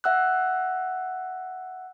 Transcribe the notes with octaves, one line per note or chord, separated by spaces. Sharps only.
E5 F#5 E6 F#6